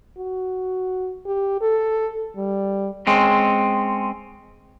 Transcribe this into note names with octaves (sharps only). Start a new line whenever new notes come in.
F#4
G4
A4
G3
G#3 C4 C#4